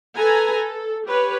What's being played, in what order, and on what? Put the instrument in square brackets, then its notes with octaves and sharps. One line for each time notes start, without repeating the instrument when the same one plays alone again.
[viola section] A4 B4 G#5 A#5
A4
G4 B4 C#5